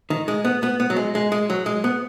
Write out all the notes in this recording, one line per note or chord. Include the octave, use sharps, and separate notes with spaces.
D#3
G#3
B3
B3
B3
F#3
G#3
G#3
G#3
F#3
G#3
B3